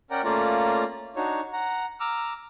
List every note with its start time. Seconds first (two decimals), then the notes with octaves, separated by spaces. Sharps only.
0.11 C#4 A#4 D5 F#5 G5 A#5
0.24 A3 A#3 C#4 F4 D5 A#5
1.16 D4 D#4 F#4 C#5
1.53 F#5 A#5
2.00 A#5 D6 E6 F6